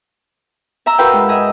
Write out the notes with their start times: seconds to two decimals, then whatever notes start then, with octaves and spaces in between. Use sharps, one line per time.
0.86 E5 A#5 E6
0.98 F#4 A#4 B4 F5 G5
1.13 G#2
1.28 G#4 D#5 E5